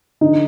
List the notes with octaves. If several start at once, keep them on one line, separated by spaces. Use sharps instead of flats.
D3 D#4